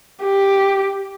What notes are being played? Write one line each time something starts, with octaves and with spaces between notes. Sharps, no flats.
G4